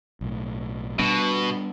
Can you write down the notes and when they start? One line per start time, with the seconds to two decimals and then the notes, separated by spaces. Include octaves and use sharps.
0.21 B1 A2
0.99 B2 G3 B3 D4